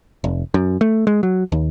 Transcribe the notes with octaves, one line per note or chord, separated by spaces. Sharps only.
F1
F#2
A3
G#3
F#3
D#2